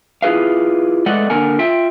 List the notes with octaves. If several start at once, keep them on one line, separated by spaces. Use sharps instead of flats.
E4 F4 G#4 B4 F5
G#3 A3 B4 D5 D#5 F#5
D3 A#3 A#4 F#5 G#5
F4 E5 G5